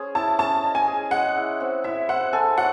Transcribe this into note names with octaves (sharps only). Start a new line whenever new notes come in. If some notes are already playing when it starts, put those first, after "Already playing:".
Already playing: C#4 G#4 C5
E4 A5
C#4 A5
D#5
G#5
G#4
G#3 F#5
E4
C4
E4 E5
C5 F#5
A4 G#5
F#3 F#5